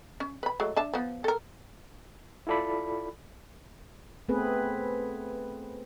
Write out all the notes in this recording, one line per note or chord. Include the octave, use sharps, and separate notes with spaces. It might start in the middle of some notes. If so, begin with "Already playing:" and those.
C#4
B4 B5
F#3 G#3 A3
D4 E5 A5
F3 B3
A4 A#4
E4 F4 A4 D5 B5
A3 B3 C4 G#4 B4